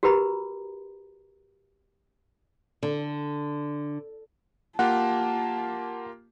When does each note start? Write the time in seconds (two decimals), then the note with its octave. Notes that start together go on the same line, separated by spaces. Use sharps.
0.03 F#4 G4 A#4 B4 A#5 B5
2.83 D3
4.79 A#3 F4 G4 F#5 A5